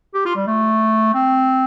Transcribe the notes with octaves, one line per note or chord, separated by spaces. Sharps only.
G4
F4
G3
A3
C4